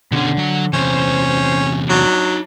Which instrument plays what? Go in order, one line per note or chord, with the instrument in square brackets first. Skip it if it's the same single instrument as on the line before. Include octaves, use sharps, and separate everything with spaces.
[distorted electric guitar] B2 C#4 [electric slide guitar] D3
[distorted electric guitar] F#3 F#5
[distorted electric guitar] E2 C3 [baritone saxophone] C#4 [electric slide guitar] C5
[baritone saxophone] F#3 [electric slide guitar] D4 D#4 D5